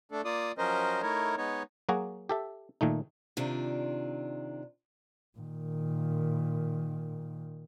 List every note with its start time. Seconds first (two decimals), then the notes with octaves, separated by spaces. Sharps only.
0.12 A3 D4 A4
0.25 A#3 F4 D5 D#6
0.58 F3 F#3 C#4 A#4 C5 D#5
1.02 A3 D#4 E4 A#4 C#5
1.37 G#3 B3 D#4 C#5
1.89 F#3 A#3 F#4 G#4
2.29 G4 A4 E5
2.81 A#2 D#3 A3 D#4
3.37 C3 D#3 D4 F4
5.39 A#2 D#3